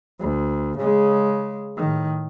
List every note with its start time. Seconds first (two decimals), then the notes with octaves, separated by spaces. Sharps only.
0.20 D2
0.78 C#3 G#3
1.77 A2 D#3